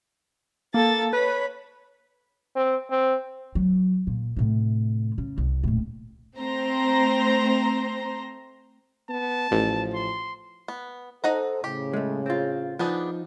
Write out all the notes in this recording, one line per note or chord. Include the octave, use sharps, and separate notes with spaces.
A#3 A4 A6
B4 C#5 B5
C4
C4
F#3
A#2
A2 C3
C#3
C2
D#1 A2
A3 C4 C5 A#5 C6
B3 A5
A1 F3
C6
B3
D#4 A4 C5 F#5 A#5
A2 C#3 G4
G#3 A3
C4 F4
F3 B3 D4 D#4 G#4